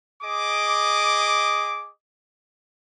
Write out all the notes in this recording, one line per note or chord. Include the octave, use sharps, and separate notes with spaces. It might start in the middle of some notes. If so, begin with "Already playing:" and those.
G#4 D#5 D6